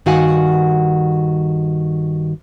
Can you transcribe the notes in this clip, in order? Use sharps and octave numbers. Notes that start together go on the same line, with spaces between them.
G2 D#3 F#4 F5 F#5 G#5